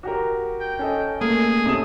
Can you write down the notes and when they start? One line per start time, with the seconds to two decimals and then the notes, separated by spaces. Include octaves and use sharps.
0.03 F#4 G4 A#4
0.61 G5
0.79 C#4 A4 D#5
1.21 A3 A#3 G#4
1.66 C3 G#3 C#4 A4 D#6 E7